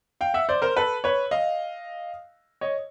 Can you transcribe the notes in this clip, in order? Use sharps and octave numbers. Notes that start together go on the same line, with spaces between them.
F5 G5
E5 F#5
C5 D5
A#4 C5
A4 B4
B4 C#5
D#5 F5
C#5 D#5